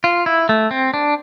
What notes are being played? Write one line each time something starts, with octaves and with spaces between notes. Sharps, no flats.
F4
E4
A3
C4
D4